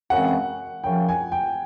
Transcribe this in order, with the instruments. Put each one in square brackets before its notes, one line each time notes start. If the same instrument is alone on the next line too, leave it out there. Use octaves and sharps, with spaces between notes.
[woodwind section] F#2 C#3 E3 G#3 C4 [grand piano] F#5
[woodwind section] F#2 C#3 F3 [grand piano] G5
[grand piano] G#5
G5